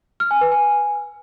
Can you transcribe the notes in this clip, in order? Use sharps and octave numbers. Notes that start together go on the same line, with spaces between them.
F6
G#5
B4
G#5